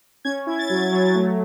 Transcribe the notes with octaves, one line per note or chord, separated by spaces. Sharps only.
C#4 G#6
E4 G#6
A6
F#3 G#6
F#3
A3